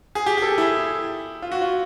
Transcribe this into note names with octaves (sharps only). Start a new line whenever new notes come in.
G#4
G4
G#4
A4
G#4
E4
F4
F#4
F4